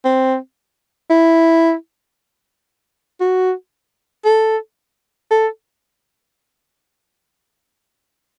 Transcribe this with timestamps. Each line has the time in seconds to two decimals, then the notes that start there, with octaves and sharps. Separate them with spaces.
0.04 C4
1.10 E4
3.21 F#4
4.25 A4
5.31 A4